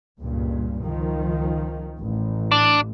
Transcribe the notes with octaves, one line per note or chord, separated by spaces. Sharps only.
C#2 G2 A#2
C#2 D#3 F3
A1
D4